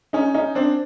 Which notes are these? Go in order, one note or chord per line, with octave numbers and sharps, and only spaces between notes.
C#4 D#4
C#4 D#4
C4 D4